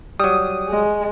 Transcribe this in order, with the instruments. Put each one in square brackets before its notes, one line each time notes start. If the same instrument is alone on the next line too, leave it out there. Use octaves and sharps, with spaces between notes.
[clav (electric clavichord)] F#3 G3 [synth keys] D#6
[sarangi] G#3